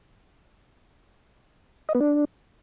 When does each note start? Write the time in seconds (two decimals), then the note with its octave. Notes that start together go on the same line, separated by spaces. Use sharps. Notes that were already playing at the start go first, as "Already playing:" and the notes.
1.89 D#5
1.95 B3
2.00 D4